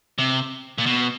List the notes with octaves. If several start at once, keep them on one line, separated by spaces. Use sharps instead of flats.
C3
A#2
B2